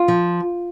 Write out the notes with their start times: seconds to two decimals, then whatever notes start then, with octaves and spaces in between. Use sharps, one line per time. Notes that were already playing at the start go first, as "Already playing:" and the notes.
Already playing: F4
0.08 F3